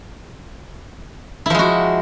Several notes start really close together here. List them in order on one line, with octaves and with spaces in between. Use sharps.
E4 F3 G#3 F#4